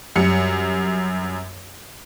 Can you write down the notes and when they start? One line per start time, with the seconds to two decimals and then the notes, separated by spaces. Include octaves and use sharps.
0.16 F#2 G3 C#7